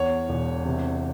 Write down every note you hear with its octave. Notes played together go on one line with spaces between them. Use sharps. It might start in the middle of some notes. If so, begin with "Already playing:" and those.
Already playing: E2 C#5
E1
C3